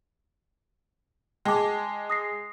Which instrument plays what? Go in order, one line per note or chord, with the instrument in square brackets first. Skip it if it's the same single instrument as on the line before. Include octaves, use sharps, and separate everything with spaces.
[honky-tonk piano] G#3 [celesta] G5 A5 D6
[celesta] D#6 A#6 C7